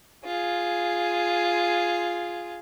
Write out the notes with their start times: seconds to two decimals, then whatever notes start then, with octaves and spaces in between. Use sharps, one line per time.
0.25 F4 G#4